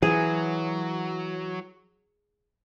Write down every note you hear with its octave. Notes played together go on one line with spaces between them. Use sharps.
E3 F#3 G#4